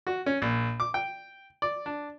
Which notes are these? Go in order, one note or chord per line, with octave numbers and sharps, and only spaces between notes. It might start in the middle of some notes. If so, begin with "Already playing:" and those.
F#4
C#4
A#1
D6
G5
D5
D4